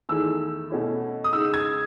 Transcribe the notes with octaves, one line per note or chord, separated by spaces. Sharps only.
E2 D#3 A3 E4 E6
B2 A3 C#4 E4
D#6
C#3 G#3 D#4 E6
G#6